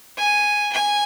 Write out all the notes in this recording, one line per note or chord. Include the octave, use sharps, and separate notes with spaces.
G#5
G#5